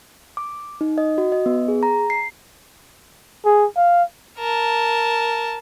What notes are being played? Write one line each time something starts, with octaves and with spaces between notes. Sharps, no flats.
D6
D#4
D#5
F#4
D#5
B3
G#4
A#5
C7
G#4
F5
A#4 A5